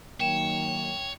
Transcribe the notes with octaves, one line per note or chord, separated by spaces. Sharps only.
D#3 F#3 A#3 C#5 G5 E7